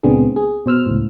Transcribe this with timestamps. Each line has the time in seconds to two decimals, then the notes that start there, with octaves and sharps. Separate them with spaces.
0.03 C#2 A#2 B3 C4 D4 G#4
0.36 G#4
0.66 B2 C5 E6 F6
0.86 C#2 A2